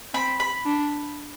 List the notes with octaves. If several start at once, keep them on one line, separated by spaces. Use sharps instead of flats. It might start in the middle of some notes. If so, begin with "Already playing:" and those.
C4 B5
B5
D4